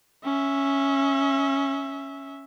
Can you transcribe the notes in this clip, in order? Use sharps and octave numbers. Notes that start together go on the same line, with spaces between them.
C#4 E5